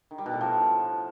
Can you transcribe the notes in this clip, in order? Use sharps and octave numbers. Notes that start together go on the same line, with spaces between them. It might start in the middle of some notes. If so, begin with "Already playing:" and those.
D#3
G3
B2
A2
F3